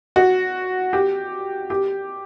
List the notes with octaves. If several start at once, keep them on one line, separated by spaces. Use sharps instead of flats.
F#4
G4
G4